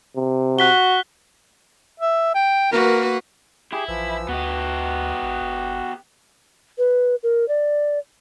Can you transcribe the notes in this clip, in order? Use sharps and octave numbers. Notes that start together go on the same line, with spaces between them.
C3
F#4 F#6 B6 G7
E5
G5
A#3 F#4 A#4 B4
E4 G4 G#4
A#1 E3 F3 E6
D2 B3 F#4 G4
A1
G1
B4
A#4
D5